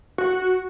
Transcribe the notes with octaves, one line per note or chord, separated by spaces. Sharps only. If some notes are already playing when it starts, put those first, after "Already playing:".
F#4